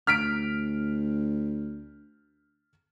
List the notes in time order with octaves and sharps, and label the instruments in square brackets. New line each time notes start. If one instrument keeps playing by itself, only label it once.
[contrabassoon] D2 [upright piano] F6 B6 D7